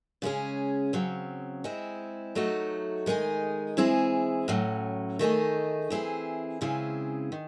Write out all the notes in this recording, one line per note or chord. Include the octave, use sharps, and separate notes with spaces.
C#3 G#3 C#4 G#4
C#3 F#3 C4
G#3 C4 E4
F#3 A3 D#4 F#4
D#3 G#3 D#4 G#4
E3 G#3 C4 E4 G#4
A2 F#3 C#4
D#3 A3 D#4 G#4
E3 C4 E4 G#4
C#3 G#3 C4 E4 G#4
D#3